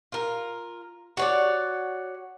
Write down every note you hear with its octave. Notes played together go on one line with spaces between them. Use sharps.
F4 A#4
F#4 C#5 D5